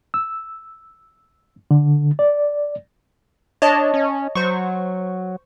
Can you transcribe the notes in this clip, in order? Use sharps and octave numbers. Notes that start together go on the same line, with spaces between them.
E6
D3
D5
D4 C#5 D#5 A5
C#4
F#3 C5 C#6